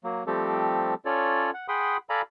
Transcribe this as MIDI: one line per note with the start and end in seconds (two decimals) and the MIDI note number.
0.04 0.24 54
0.04 0.24 58
0.27 0.94 53
0.27 0.94 55
0.27 0.94 57
0.27 0.94 60
0.27 0.94 67
0.27 0.94 69
1.05 1.51 61
1.05 1.51 65
1.05 1.51 69
1.05 1.51 73
1.05 1.51 74
1.54 1.67 78
1.68 1.97 68
1.68 1.97 78
1.68 1.97 79
1.68 1.97 83
1.68 1.97 84
1.68 1.97 87
2.10 2.22 69
2.10 2.22 74
2.10 2.22 77
2.10 2.22 80
2.10 2.22 82
2.10 2.22 83